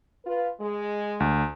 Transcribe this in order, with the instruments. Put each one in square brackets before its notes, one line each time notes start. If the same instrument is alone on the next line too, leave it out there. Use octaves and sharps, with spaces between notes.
[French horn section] F4 B4
G#3
[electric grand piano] D2